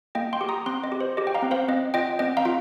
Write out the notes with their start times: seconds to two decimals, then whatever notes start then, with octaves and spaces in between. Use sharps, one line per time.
0.15 A#3 D#5 G5
0.33 G5 C6
0.41 G4
0.49 A#5 D#6
0.66 C4 G5 C6
0.84 D#5
0.92 G4
1.01 C5
1.17 G4 D#5
1.27 G5
1.35 F5 A#5
1.42 C4
1.51 C5 F5
1.68 C4 D#5
1.94 F4 D#5 G5
2.19 C4 D#5 G5
2.37 F5 A#5
2.45 F4